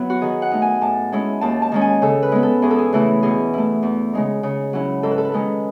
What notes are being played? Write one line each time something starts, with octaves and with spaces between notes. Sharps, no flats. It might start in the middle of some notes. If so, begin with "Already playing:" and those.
Already playing: F#3 B3 E4
F#4
D#3 G#4
F#5
A3 D#4
G#5
A2 A5
G#3 C#4 E4
D#2 A5
A5
D#3 G#3 C#4
G#5
C#3 A4
B4
G#3 B3
A4
E2 G#4
A4
G#4
C#3 E3 A3 E4
B2 G#4
A3 E4
E2
C#3 G#3 D#4
C#3
F#3 C#4 E4
G#2 A4
B4
A4
B4
D#3 G#3 C#4 A4